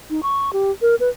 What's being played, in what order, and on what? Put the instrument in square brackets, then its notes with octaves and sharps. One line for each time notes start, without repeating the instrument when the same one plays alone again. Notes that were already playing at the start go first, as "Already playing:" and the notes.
[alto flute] D#4
C#6
G4
A#4
B4